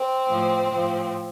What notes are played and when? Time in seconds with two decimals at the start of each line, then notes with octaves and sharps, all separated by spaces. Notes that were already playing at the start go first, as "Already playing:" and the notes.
Already playing: C4
0.26 A2 F3
0.72 A2 F3